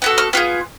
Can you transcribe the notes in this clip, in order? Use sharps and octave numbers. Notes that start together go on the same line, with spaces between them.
B3 F#4 A4
F6
B3 F4 G#4 F6